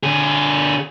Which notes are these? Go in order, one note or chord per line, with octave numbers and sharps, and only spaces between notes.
D3 G#4